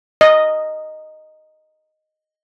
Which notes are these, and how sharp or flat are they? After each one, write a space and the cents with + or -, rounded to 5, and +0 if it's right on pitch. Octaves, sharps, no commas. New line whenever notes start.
D#5 -5